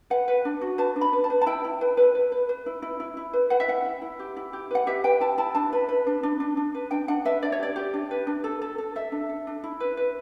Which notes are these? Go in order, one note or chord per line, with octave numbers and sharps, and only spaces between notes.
B4 F#5
B4
D4
F#4
B4 A5
D4
B5
B4
A5
B4
A5
E4 G5
E4
B4
B4
B4
B4
B4
E4
E4
E4
E4
B4
B4 F#5
E5
E4 F#5
E4
E4
G4
E4
G4
B4 F#5
G4 E5
B4 G5
E4 A5
E4 A5
D4 A5
B4
B4
D4
D4
D4
D4
B4
D4 G5
D4 F#5
B4 E5
D4 D5
C#5
G4 D5
G4
D4
B4
D4
A4
A4
A4
A4 E5
D4
A4
D4
E4
B4
B4